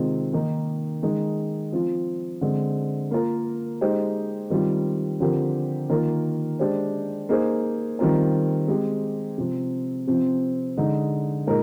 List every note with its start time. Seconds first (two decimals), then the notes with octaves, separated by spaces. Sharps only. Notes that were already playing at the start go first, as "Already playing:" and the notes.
Already playing: C3 D#3 G#3 C4 F4
0.33 D#3 A#3 D#4
1.03 D#3 G#3 D#4
1.72 F3 C4 F4
2.41 D3 G#3 C4
3.11 A#3 F4 A#4
3.81 G#3 D#4 G4 C5
4.50 D#3 G3 C4 F4
5.20 D3 F3 C4 G4 A#4
5.89 D#3 A#3 F4 A#4
6.59 G#3 D4 G4 C5
7.29 A#3 D#4 G#4 C5
7.99 D#3 G3 C4 F4 A#4
8.68 G#3 C4 G4
9.38 C3 F3 C4
10.07 C3 F3 C4
10.77 D3 G#3 D#4
11.47 A#2 G#3 D#4 A#4